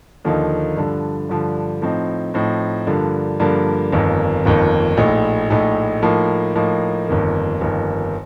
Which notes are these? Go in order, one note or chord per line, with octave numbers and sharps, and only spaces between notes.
D#2 D3 F3 A#3 D#4
G2 D3 F3
G2 D3 F3
A2 F3 C4 D#4
A2 F3 C4 D#4
G2 D3 F3 A#3
G2 D3 F3 A#3
G1 F2 D#3 A#3
G1 F2 D#3 A#3
A#1 A2 A3 D#4
A#1 A2 A3 D#4
A2 F3 A#3 D#4
A2 F3 A#3 D#4
G1 F2 D#3 A#3
G1 F2 D#3 A#3